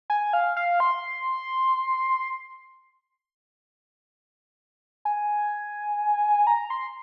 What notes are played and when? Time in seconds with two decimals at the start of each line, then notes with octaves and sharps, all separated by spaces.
0.10 G#5
0.33 F5
0.56 F5
0.80 C6
5.05 G#5
6.47 A#5
6.70 C6